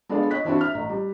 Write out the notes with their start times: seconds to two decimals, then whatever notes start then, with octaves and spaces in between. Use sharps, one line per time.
0.09 G#3 B3 D4 F4 A4 D5
0.31 C#5 D#5 F#6 B6
0.45 E3 C4 D4 E4 F#4
0.58 E5 F6
0.74 A1 A#5
0.89 G3